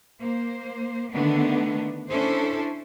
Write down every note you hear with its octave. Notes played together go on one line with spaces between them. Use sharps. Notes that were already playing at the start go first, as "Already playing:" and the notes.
A#3 C5
D3 D#3 A3 B3 D4
C#4 D4 E4 A4 C5